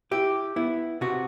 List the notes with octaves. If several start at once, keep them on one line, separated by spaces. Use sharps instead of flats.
E4 G4
B3 E4
C3 F#4